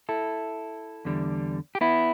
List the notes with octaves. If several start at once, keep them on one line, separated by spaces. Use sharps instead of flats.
E4 A4
E2 D3 G3
G4
B3 E4